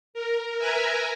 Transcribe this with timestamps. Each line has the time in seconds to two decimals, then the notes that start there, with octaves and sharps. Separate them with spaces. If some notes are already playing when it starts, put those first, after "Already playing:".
0.14 A#4
0.58 A#4 B4 E5 G#5 A#5